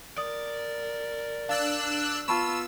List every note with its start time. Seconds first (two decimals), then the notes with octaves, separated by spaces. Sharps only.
0.18 A#4 D5 D#6
1.49 D4 F5 E6 F#6 A6
2.28 B3 F4 A5 B5 C#6 E6